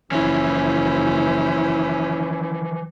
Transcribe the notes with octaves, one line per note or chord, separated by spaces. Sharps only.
F#1 E3 F3 C#4 E4 C5